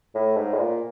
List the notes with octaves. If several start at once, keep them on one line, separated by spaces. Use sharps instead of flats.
A2
G#2
A2
A#2